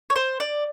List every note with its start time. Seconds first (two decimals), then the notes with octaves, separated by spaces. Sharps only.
0.10 C#5
0.16 C5
0.40 D5